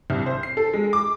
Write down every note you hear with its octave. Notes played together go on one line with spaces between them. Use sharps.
C2
C5
C7
A4
G#3
D6